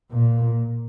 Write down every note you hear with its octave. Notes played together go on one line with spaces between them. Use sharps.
A#2